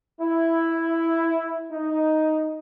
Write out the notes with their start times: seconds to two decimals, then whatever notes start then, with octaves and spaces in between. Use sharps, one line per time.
0.20 E4
1.71 D#4